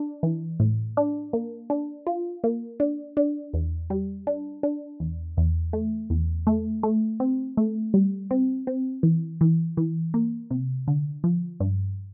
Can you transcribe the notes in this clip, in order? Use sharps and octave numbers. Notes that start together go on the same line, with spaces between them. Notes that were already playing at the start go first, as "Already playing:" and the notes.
Already playing: D4
E3
A2
D4
A#3
D4
F4
A#3
D4
D4
E2
G3
D4
D4
E2
E2
A3
E2
A3
A3
C4
A3
G3
C4
C4
E3
E3
E3
A#3
C3
D3
F3
G2